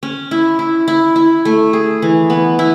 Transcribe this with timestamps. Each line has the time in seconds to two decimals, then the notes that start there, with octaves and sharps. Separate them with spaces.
0.03 C#4
0.31 E4
0.59 E4
0.88 E4
1.16 E4
1.45 A3
1.73 G#4
2.02 E3
2.30 B3
2.59 E4